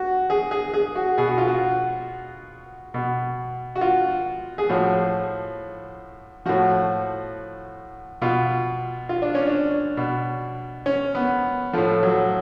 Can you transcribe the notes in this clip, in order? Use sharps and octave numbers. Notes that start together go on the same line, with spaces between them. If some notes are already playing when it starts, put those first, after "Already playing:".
Already playing: F#4
G#4
G#4
G#4
F#4
B2 G#4
F#4
F4
F#4
B2
F#4
F4
G#4
A2 F3 F#4
A2 F3 F#4
B2 F4
F4
D4
C#4
D4
B2
C#4
B3
A2 F3 A3
F#3